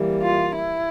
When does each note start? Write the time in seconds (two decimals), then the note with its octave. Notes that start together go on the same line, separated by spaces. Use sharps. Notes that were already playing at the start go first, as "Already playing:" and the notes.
Already playing: E3 G3 A#3
0.22 F4
0.55 E4